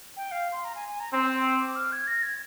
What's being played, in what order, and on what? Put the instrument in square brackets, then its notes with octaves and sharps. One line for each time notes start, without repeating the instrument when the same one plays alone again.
[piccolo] G5
F5
C6
A#5
G#5
G#5
A#5
[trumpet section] C4 [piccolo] C6
[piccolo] D6
F6
G#6
A#6
G#6